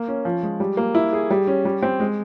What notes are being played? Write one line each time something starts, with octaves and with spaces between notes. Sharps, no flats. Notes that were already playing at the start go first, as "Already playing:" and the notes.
Already playing: A#3
C#4
F3
G#3
G3
A#3
E4
G#4
G3
C#4
G3
C4
G#3